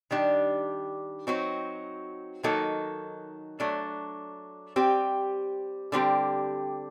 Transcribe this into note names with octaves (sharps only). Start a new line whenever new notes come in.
D#3 G3 D4 G4
F#3 C4 D#4 F#4
D#3 F#3 A#3 D#4 A4
F#3 A3 D4
G3 C4 G4
D3 G3 C4 G4